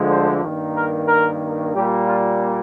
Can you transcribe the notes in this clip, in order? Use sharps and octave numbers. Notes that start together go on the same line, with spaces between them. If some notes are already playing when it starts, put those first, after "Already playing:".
Already playing: D2 D3 F3 G#3
C5
G2 D#3 A#3
A#4
A#4
A#2 G3 A#3 G4
F4